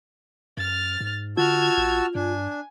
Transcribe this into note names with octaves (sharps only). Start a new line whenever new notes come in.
F#2 F6 A6
G#2
D3 F4 F#4 A5 E6 F6 G#6
A1
G2 D4 G#5